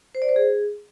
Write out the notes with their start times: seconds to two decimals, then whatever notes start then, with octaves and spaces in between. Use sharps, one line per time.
0.15 C5
0.22 D5
0.29 C5
0.36 G#4